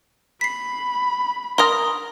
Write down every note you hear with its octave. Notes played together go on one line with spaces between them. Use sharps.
B5 B6 C7
A#4 A#5 C6 D#6 F6